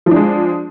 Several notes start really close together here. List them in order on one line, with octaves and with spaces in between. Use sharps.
F3 D4 G#3